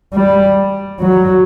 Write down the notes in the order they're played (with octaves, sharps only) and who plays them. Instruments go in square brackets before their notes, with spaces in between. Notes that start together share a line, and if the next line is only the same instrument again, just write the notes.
[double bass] G3
F#3